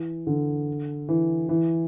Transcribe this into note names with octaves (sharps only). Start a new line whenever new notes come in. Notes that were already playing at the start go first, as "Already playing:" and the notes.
Already playing: E3
D3
E3
E3